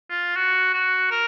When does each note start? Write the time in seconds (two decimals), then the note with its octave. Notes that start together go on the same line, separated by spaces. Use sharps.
0.10 F4
0.36 F#4
0.74 F#4
1.11 A#4